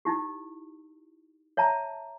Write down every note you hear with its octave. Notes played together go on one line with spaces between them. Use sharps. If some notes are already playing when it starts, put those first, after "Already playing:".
D#4 E4 G4
C#5 E5 A5 A#5